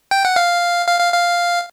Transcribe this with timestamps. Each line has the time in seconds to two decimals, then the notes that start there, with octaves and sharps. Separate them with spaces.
0.11 G5
0.25 F#5
0.36 F5
0.88 F5
1.00 F5
1.13 F5